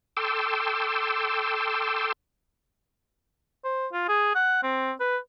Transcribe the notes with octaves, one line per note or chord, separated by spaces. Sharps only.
A4 G5 C6 D6 E6
C5
F4
G#4
F#5
C4
B4